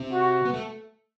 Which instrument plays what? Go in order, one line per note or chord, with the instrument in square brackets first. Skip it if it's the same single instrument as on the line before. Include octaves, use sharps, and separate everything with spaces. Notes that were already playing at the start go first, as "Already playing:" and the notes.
Already playing: [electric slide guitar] C3 C4
[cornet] F#4
[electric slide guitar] B3
A3